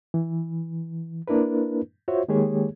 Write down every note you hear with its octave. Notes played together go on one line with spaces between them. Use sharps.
E3
A#3 D4 E4 A#4 B4
F4 F#4 C5 C#5 E5
D#3 G#3 A#3 G4 G#4 C#5